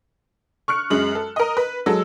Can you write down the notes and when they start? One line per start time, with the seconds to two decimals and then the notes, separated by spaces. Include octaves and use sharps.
0.68 C#6 F6 F#6 C#7
0.90 F#2 G#3 F#7
1.15 A4
1.36 A#4 D#5
1.57 B4
1.86 F#3 G#3 A4 E6